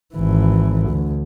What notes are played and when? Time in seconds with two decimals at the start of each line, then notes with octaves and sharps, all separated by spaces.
0.15 G#1 E3
0.89 D2